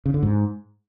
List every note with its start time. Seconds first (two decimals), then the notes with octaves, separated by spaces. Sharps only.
0.06 C#3
0.14 D3
0.23 G#2